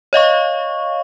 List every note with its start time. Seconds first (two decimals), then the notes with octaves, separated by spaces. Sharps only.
0.13 C#5 D#5 F5 C#6